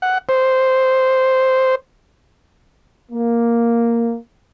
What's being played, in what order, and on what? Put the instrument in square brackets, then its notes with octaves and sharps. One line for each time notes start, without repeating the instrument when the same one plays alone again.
[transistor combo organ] F#5
C5
[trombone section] A#3